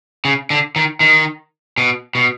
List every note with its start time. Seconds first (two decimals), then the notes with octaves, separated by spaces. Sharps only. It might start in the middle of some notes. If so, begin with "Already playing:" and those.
0.25 C#3
0.50 D3
0.76 D#3
1.00 D#3
1.78 B2
2.15 B2